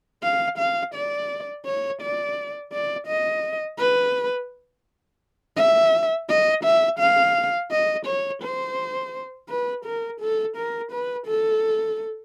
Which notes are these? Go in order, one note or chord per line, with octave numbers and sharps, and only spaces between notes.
F5
F5
D5
C#5
D5
D5
D#5
B4
E5
D#5
E5
F5
D#5
C#5
C5
B4
A#4
A4
A#4
B4
A4